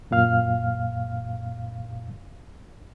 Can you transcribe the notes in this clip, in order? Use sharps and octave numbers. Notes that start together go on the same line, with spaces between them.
F#2 A#2 F5 F6